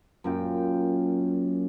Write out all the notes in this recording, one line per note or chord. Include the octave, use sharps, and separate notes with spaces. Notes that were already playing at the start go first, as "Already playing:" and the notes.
F#2 A#2 G5